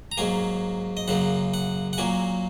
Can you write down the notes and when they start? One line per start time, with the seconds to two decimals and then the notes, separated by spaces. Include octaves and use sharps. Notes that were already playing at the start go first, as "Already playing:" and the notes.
0.12 A#5
0.18 G#2 F#3 A#3 G#5
0.97 D#5
1.08 F#2 C#3 A#3 F#5
1.54 F#5
1.93 F#5
1.98 A#2 F#3 A#3 G#5